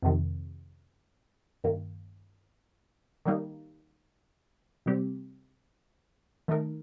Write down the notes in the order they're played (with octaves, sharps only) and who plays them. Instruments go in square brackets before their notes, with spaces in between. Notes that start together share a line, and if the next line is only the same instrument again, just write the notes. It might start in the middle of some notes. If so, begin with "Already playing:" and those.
[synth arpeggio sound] F2 C3 D#3
G2 D#3 A#3
D#3 G3 A#3 D#4
C3 G3 C4 G4
D#3 A3 D#4 A#4